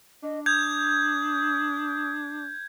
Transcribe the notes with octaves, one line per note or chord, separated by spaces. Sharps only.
D4 D#5
D#6 G6 G#6